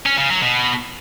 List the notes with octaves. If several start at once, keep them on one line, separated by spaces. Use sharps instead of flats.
C#4
C#3
F#3
B2